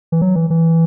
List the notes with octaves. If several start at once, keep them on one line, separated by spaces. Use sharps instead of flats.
E3
F#3
E3
E3